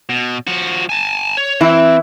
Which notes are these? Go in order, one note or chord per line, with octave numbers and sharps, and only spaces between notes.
B2
F3 F#4
G#5 A5
C#5
E3 C4 E4